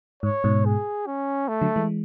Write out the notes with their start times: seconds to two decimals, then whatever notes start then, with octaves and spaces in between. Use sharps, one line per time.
0.23 G#2 C#5
0.44 G#2 B2
0.65 G#4
1.06 C#4
1.48 A3
1.61 D3 F#3
1.76 E3 G#3